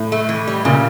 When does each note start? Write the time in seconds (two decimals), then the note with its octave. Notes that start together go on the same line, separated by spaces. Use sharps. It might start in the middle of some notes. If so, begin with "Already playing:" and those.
Already playing: A2
0.12 A3
0.29 E3
0.47 G3
0.65 A#2 C#3